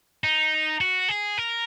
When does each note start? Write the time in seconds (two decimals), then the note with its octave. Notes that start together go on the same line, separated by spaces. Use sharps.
0.24 D#4
0.81 F#4
1.09 G#4
1.38 A#4